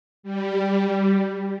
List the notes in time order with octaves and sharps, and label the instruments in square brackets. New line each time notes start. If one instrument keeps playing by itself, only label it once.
[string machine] G3